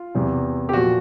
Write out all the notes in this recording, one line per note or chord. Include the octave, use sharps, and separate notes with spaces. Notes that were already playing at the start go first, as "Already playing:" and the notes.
Already playing: F4
E2 C3 E3
G4
A#2 F3 F#4